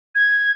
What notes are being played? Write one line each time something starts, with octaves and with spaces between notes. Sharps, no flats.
G#6